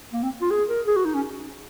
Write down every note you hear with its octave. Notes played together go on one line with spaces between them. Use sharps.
A#3
C4
F4
G#4
A#4
G#4
F#4
D#4
C#4